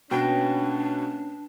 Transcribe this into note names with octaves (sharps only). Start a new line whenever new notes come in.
B2 A#3 C#4 D4 B4 G5 A#6